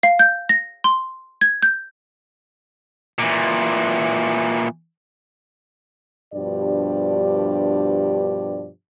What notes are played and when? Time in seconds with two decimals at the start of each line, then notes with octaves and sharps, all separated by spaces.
0.03 F5
0.19 G6
0.49 A#6
0.84 C6
1.41 G#6
1.63 G6
3.19 A#2 E3
6.34 G2 B2 F3 D4 G4 D5